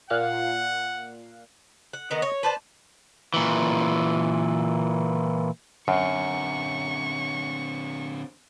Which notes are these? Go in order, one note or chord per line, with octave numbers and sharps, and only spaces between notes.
A#2 F5 F#5 F#6
F#5
D#3 B3 D#5
C#5
B4 C5 D5 A5
A#2 E3
F#2 D3 C4 C#6